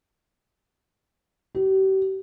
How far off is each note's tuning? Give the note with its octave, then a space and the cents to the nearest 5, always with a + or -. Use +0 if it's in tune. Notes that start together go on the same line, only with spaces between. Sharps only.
G4 -40